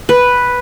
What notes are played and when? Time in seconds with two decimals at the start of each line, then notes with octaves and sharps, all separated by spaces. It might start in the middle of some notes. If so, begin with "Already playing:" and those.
0.09 B4